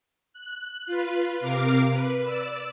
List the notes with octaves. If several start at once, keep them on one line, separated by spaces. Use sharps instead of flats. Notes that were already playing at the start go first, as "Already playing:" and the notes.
F#6
F4 B4
C3 A#4 F5 D6
B4
D5 E6